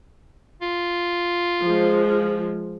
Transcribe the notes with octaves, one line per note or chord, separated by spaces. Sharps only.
F4
F3 G#3